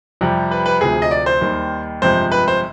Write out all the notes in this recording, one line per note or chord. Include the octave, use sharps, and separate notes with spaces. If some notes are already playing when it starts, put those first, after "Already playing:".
F2 C3 G3
B4
B4
D2 C3 F3 G#4
D#5
D5
C5
D#2 D#3 G3
G1 F2 C3 F3 G#3 C5
B4
C5